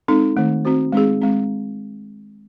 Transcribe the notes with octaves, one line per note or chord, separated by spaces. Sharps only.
G#3 C4 D#4 A4
D#3 A3 C4
C4 F#4 C5
G#3 C4 D#4 G#4
G#3 C4